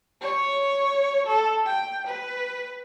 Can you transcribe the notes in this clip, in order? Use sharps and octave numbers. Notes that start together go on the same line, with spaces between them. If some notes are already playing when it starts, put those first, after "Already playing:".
C#5
A4
G5
B4